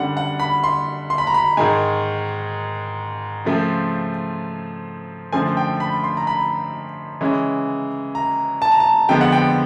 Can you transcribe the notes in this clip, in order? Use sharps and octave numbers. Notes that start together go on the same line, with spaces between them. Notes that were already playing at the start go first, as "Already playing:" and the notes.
Already playing: F#2 D3 G3 F#5
F#5
B5
C6
C6
B5
A#5
B5
G#2 D#3 G#3 G#5
C#3 F3 A3 C4
F#2 D3 F3 A3 C4 G#5
G5
B5
C6
A#5
B5
C#3 E3 G#3 C#4
A#5
A5
A#5
A5
F2 D3 F3 G#3 B3 G5
F#5
G5